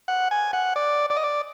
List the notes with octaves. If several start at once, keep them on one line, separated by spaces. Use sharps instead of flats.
F#5
G#5
F#5
D5
D5
D#5
D5